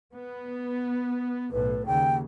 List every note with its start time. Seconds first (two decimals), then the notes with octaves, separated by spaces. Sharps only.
0.15 B3
1.52 B1 A2 B4
1.86 D#2 C#3 G5